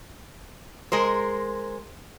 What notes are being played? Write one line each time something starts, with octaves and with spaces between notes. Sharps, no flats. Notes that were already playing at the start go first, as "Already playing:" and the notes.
G#3 A#4 C5